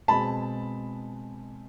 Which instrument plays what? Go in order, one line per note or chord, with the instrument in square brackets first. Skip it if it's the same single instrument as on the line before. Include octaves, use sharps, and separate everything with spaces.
[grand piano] B2 G#3 C4 A5 B5